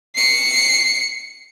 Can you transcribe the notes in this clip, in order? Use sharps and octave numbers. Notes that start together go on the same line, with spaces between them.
C7 C#7